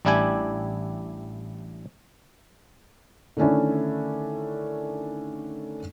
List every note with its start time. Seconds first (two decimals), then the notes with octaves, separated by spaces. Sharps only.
0.05 A1 G3 D4 E4 G4 G#5
3.37 D3 D#3 A3 C#4 D4 E4